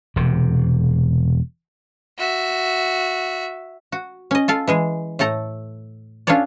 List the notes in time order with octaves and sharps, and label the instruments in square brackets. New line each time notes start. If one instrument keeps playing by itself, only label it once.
[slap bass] E1 C3
[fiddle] F#4 E5
[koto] F#4
C#4 D#5
F4 A4 F5
E3 G#3 G#4
A2 A3 A4 A#5
C#4 D4 F4 A4 C#5 D5